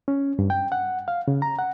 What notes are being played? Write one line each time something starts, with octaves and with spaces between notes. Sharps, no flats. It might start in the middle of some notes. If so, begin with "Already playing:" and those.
C#4
G2
G5
F#5
F5
C#3
A#5
F#5